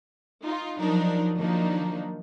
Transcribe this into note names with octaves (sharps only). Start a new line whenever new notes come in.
D#4 F4
F3 F#3 D4 D#4 A#4
D#3 F3 F#3 A#3 D4 D#4